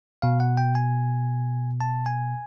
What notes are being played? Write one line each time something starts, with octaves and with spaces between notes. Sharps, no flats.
B2 F5
F#5
G5
G#5
A5
G#5